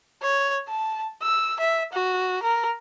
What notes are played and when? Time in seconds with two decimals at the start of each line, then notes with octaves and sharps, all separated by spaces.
0.22 C#5
0.68 A5
1.23 E6
1.60 E5
1.93 F#4
2.43 A#4